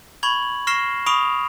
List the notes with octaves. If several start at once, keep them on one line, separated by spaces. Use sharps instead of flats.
B5 C#6 G#6 F#7
C#6 F6 A#6 C7 E7 G7
B5 C#6 D#6 D7 F7